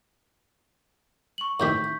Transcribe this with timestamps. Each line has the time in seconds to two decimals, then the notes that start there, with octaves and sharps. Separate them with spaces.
1.38 C#6 F#7
1.60 A2 C3 D#3 C#6 G6 B6